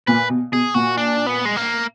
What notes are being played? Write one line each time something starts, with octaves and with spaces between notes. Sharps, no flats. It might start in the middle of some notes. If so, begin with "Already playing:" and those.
A#2 B4
B2
B2 G#4
A#2 F#4
D4
B3
G#3
A#3